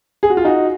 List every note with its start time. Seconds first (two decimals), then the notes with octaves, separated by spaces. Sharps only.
0.23 G#4
0.30 F#4
0.37 F4
0.45 D#4 F#4